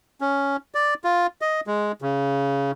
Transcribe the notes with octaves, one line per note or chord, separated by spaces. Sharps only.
C#4
D5
F4
D#5
G#3
C#3